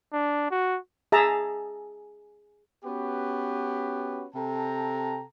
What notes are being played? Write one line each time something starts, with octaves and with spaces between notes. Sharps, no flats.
D4
F#4
G#4 E5 A5 A#5
B3 C#4 F#4 G4 B4
C3 A4 G5 A5 A#5